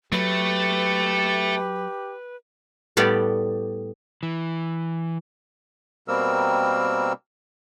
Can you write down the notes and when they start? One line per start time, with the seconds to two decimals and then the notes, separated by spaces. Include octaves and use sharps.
0.12 F#3 A3 G4 B4
2.97 A2 G3 B3 G4 D5
4.23 E3
6.08 B2 G3 A#3 C4 A#4 E6